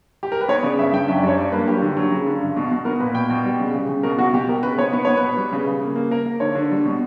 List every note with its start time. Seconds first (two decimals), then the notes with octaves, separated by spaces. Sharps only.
0.23 G4
0.32 A#4
0.41 B4
0.48 B3 C#5
0.63 C#3 D5
0.79 G2 E5
0.93 G2 G5
1.08 F#2 E5
1.18 D5
1.23 G3 C#5
1.38 G2 D5
1.52 A#3 B4
1.68 F#3 G4
1.82 D3
1.97 F#3
2.11 C#3
2.26 D3
2.41 G2
2.57 B2
2.71 B2
2.85 B3 A#4
3.00 A#2 B4
3.15 B2 G5
3.30 B2 G5
3.45 G3
3.60 C#3
3.74 C#3
3.89 C#3
4.03 B2 A#4
4.19 B2 F#4
4.33 B2 G4
4.48 B2 A#4
4.63 C#3 B4
4.78 B3 C#5
4.93 B3 B4
5.05 B3 C#5
5.17 B2 B4
5.37 G3
5.52 C#3
5.66 C#3
5.82 A#3
5.96 A#3
6.11 A#3 A#4
6.26 A#3
6.40 D3 C#5
6.55 D3
6.71 G3
6.85 B2